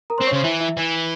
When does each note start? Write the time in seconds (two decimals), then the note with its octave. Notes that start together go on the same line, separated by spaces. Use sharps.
0.10 A#4 A#5
0.18 C5 C6
0.21 C4
0.27 C#5 C#6
0.33 C#3 C5 C6
0.44 E3 E4 E5
0.60 E4 E5
0.77 E3